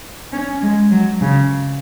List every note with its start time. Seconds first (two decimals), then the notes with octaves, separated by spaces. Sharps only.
0.32 C#4
0.62 G#3
0.91 F#3
1.21 C#3